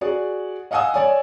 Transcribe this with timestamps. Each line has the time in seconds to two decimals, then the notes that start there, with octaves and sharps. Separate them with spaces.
0.01 F#4 G#4 D5
0.71 D#5 F5 F#5 G#5 D#6 E6
0.94 C#5 D5 G#5